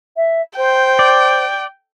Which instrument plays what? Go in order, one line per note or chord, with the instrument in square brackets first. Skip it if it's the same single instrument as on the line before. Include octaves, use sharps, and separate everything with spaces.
[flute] E5
[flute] C5 [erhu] G5
[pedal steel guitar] D5